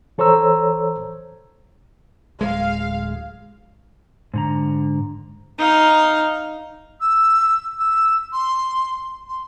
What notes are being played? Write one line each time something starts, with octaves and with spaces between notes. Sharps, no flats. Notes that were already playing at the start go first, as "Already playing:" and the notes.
E3 A4 C5 C#5 A#5 E6
D1 G#3 F5
G#2 D3 A#5
D#4 F5
E6
E6
C6
C6